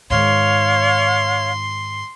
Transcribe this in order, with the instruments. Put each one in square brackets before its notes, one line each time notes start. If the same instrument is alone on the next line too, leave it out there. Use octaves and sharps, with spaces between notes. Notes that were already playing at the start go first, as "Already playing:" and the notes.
[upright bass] G#2 D#3 [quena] C#5 [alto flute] F5 [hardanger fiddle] C6